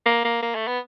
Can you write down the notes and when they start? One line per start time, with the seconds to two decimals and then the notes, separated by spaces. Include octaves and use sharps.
0.06 A#3
0.24 A#3
0.42 A#3
0.55 A3
0.67 B3